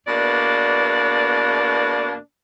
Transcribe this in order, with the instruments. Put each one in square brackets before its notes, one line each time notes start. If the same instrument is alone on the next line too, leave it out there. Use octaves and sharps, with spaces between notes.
[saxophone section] E2 B2 A#3 D4 D5